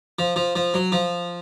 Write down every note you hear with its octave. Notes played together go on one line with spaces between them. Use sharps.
F3
F3
F3
F#3
F3